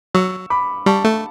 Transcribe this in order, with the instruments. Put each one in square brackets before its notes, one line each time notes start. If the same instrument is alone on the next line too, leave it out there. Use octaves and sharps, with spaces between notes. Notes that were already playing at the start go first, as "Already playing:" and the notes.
[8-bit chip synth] F#3 [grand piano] C#6 E6
[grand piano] B5 D6
[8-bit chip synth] G3 [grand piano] A5 C#6
[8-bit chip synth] A3